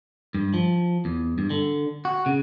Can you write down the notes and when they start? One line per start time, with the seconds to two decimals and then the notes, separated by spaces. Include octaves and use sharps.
0.35 G2
0.54 F3
1.05 E2
1.38 G2
1.50 D3
2.05 F#4
2.26 C#3